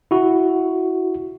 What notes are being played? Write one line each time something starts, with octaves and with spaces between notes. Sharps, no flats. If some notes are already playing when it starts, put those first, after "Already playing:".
E4 F#4